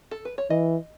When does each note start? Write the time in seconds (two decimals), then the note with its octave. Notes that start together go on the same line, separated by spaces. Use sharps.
0.11 A4
0.25 B4
0.38 C#5
0.50 E3 D#5